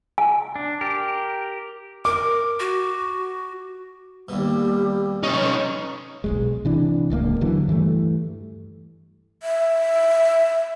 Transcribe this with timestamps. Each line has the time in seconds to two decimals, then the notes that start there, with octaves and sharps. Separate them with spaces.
0.18 G#5
0.56 D4
0.81 G4 A#4
2.05 A#4 D6
2.60 F#4
4.29 D#2 B2 G3
5.23 C#4 D#4 B4
6.24 B1 E2 G#3
6.65 C3 E3 D4
7.10 D1 C#2 C#3 A#3
7.41 D#2 D3 E3 F#3
7.68 G2 E3 G3 A3
9.43 E5